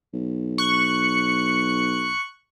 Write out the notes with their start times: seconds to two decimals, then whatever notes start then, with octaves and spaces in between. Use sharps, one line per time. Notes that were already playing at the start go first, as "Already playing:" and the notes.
0.13 B1
0.58 C#6 F#6